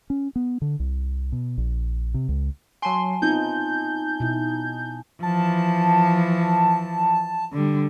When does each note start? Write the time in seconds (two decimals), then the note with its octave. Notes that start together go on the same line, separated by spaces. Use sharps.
0.10 C#4
0.36 B3
0.62 D3
0.80 C2
1.32 B2
1.58 A#1
2.14 C3
2.29 C#2
2.82 F#3 G#5 A5 C6
3.22 B3 C4 D#4 F4 G6
4.20 B2 E4
5.23 E3 F3 A5
7.53 D3 G3